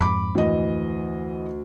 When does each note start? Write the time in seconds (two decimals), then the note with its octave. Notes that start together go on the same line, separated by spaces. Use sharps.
0.01 F2 G#2 B5 D6
0.35 D2 E3 D#5